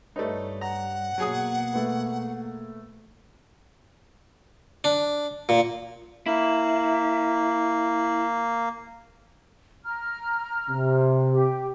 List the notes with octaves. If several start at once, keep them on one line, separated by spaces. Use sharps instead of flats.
G2 A3 D#4 B4 C#5 D5
F#5 A#5
B2 F#3 A#3 G#4 D#6
A3 B4
D4
A#2
A#3 E4
A#5 F6
C3
G4